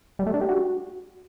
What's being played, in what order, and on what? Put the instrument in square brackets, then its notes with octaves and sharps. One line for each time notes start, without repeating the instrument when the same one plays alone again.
[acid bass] G3
A3
D4
G4
F#4